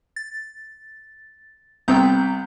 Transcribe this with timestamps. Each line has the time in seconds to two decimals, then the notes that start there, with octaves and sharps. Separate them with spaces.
0.16 A6
1.88 C2 B3 C4 G5 A#5 G6